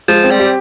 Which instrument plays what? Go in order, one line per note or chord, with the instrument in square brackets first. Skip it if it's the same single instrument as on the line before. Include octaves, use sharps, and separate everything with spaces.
[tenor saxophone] F3 [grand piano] G#3
[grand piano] C4
[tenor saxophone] G3
[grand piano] G4